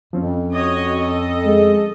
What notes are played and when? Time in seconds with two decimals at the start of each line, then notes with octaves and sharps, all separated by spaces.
0.13 F2 F3 C4 C#4
0.54 F#4 C#5 D#5
0.98 A4 D#5
1.46 G#3